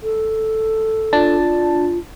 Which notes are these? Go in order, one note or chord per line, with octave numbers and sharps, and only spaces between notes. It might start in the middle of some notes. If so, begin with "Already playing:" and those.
A4
D4 F4 A5